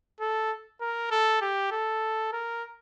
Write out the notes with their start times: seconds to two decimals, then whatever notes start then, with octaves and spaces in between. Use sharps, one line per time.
0.20 A4
0.81 A#4
1.11 A4
1.41 G4
1.71 A4
2.32 A#4